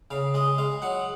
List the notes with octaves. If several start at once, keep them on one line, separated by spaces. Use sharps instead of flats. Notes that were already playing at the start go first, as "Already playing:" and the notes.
C#3 F5
G#3 D#5
G#3 F5
F#3 F#5